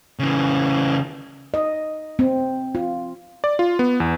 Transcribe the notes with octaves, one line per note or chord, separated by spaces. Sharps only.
C#3 E3
D#5
C4
F4
D5
F4
B3
E2